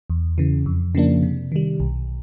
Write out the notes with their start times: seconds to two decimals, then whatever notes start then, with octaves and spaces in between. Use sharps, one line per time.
0.10 E2
0.38 C#3 E3
0.66 F2
0.95 C#3 F3 A#3 D4
1.23 C3
1.52 D#3 G3
1.80 B1